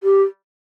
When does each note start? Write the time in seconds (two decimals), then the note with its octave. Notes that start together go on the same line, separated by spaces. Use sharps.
0.03 G4